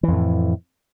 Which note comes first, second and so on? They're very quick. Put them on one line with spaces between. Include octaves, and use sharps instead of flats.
E3 F2 A2